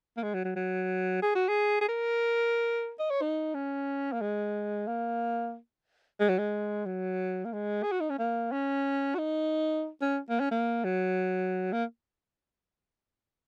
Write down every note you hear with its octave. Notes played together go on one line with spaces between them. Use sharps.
A#3
G#3
F#3
F#3
F#3
G#4
F#4
G#4
G#4
A#4
D#5
C#5
D#4
C#4
A#3
G#3
A#3
G#3
F#3
G#3
F#3
A#3
G#3
G#4
F#4
D#4
C#4
A#3
C#4
F#4
D#4
C#4
A#3
C#4
A#3
F#3
A#3